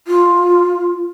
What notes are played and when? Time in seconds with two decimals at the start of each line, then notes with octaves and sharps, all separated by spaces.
0.08 F4